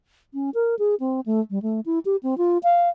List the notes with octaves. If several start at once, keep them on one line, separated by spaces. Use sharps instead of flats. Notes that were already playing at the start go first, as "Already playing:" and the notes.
C#4
A#4
G#4
C4
A3
G3
A3
E4
G4
C4
F4
F5